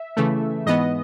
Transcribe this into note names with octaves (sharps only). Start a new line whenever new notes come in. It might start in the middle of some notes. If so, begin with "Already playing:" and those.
Already playing: E5
C#3 E3 A3
G#2 E3 B3 D#5